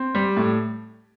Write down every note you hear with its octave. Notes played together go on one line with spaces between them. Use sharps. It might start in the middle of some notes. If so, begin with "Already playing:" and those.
Already playing: C4
G3
A2